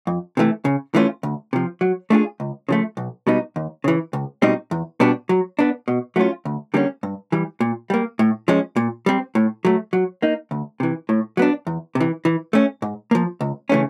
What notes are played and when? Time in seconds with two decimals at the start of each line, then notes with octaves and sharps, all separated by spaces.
0.07 F2
0.37 C3 E3 A3
0.65 C#3
0.95 E3 A3 C#4 F4
1.23 D2
1.53 C3 F3
1.81 F#3
2.10 A3 D4 F4 G#4
2.40 C#2
2.69 C#3 F3 A3
2.97 B1
3.27 B2 G3 B3 D#4
3.56 D#2
3.84 C#3 E3
4.13 C#2
4.42 B2 G3 C4 D#4
4.71 E2
5.00 B2 G3 B3 D4
5.29 F#3
5.59 B3 D4
5.88 B2
6.16 F#3 A3 C#4 F4
6.45 D2
6.74 D3 G3 A#3 C#4
7.03 G2
7.32 E3 G3
7.60 A#2
7.90 G3 A#3
8.19 A2
8.48 F3 G#3 C#4
8.76 A#2
9.06 G3 C4
9.35 A2
9.65 F#3 A3
9.93 F#3
10.22 A#3 D#4
10.51 D2
10.80 C3 E3
11.09 A2
11.37 F#3 B3 D4
11.67 E2
11.95 C3
12.00 E3
12.25 E3
12.53 A3 C#4
12.82 G#2
13.11 F3 A#3
13.41 C#2
13.69 C#3 E3 A3 C#4